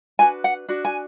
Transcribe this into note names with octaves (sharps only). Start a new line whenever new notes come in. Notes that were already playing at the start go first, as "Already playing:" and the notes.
D4 F#4 B4 G#5
F#5
D4 F#4
G#5